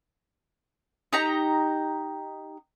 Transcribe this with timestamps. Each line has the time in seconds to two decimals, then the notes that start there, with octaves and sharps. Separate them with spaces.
1.13 D#4 G4 A#5